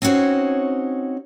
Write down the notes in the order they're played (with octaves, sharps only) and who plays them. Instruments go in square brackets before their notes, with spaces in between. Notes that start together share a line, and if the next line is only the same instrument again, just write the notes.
[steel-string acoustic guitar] C4 C#4 D#4 F#4 C5 C#5